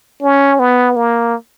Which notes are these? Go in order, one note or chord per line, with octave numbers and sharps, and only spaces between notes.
C#4
B3
A#3